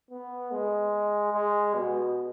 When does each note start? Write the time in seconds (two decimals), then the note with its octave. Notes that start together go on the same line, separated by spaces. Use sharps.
0.11 B3
0.52 G#3
1.33 G#3
1.75 B2